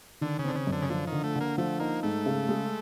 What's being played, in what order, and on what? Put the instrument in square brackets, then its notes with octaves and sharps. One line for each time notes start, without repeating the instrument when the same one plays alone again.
[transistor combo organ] D3 [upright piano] D#3
[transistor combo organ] C#3
[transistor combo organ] D3 [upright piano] C4
[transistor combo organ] C#3
[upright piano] F#2
[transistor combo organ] D3
C#3
[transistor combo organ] D3 [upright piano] F3
[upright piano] D3 [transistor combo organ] D#3
[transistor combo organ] A3
[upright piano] D3 [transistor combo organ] A#3
[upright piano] F3 [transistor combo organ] A3
[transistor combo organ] A#3 [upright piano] D#4
[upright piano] G#2 [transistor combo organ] A3
[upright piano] C#3
G#3